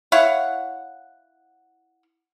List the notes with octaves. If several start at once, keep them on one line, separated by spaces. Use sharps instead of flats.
E4 C#5 F5 F#5